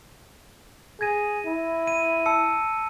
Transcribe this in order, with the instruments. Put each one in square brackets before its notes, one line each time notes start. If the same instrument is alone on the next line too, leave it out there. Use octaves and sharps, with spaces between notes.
[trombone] G#4 [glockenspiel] G#6 A#6 D#7
[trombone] E4
[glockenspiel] D#7
A5 E6 C#7